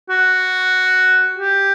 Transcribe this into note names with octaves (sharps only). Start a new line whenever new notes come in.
F#4
G4